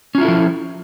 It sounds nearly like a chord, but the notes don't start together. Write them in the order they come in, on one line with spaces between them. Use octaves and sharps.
C#4 F4 E4 A4 F3